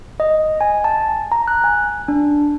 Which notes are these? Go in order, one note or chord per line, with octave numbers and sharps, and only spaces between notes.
D#5
G#5
A5
A#5
F#6
G#5
D4